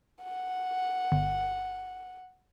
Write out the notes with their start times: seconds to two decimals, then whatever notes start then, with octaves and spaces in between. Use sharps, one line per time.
0.23 F#5
1.12 G1